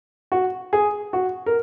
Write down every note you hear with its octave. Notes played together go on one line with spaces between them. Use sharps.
F#4
G#4
F#4
A#4